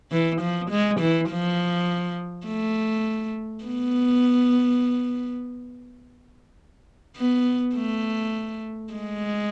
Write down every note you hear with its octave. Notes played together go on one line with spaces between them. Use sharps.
E3
F3
G#3
E3
F3
A3
B3
B3
A3
G#3